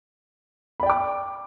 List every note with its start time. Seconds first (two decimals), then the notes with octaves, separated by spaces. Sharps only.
0.80 B5
0.83 D5
0.86 G5
0.90 D6